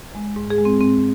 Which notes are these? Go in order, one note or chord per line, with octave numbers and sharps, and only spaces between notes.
G#3
G#2
G#4
G#3
C4
G#2 C4